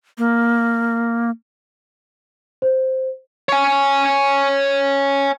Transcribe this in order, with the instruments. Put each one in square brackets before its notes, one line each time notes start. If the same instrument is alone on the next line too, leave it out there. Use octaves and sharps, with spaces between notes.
[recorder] A#3
[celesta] C5
[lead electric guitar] C#5 G#5